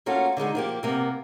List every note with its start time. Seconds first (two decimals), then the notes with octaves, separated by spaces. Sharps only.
0.06 A#3 C#4 F4 F#4 A4
0.37 D3 D#3 G#3 D#4
0.55 F3 A#3 G4
0.83 C3 A#3 B3